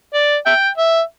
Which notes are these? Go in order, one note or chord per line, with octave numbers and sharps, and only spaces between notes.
D5
E5 G5
E5